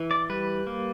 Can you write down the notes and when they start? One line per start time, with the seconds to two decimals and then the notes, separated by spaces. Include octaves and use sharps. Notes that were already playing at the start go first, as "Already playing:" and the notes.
Already playing: E3
0.11 D5
0.30 G3 B4
0.67 A#3